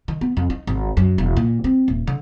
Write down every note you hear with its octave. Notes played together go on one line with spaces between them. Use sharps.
D#3
B3
F2
D#4
G#1
F#2
E1
A#2
C4
D#1
D3